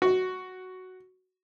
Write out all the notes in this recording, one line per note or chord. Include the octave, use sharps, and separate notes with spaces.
F#4